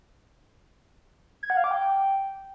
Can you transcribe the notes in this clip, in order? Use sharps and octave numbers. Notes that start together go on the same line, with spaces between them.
G#6
F#5
F5
D6
G5